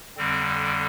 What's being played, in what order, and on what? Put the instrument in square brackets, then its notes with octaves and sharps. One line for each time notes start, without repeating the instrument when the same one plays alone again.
[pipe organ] F2 D3 G3 C4